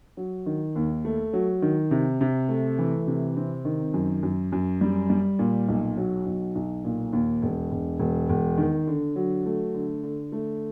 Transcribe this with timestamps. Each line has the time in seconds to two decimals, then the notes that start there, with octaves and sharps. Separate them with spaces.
0.17 F#3
0.46 D#3
0.75 D#2
1.05 A3
1.33 F#3
1.62 D#3
1.91 C3
2.21 C3
2.49 A3
2.78 E3
3.07 C3
3.37 C4
3.65 D#3
3.94 F#2
4.23 F#2
4.52 F#2
4.81 G3
5.10 G3
5.39 A#2
5.68 B1
5.97 F#3
6.26 B1
6.55 B1
6.85 A#2
7.13 D#2
7.42 E1
7.72 E1
7.99 E1
8.29 E1
8.58 D#3
8.87 D3
9.16 F#3
9.45 A3
9.74 D3
10.03 D3
10.32 A3